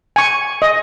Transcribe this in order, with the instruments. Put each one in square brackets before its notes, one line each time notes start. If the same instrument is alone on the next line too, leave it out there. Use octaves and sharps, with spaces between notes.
[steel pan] G#5 C#6
D#5